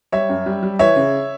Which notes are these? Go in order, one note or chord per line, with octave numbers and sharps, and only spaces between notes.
G3 C#5 E5
F#2
G3
G3
E3 C#5 E5
C#3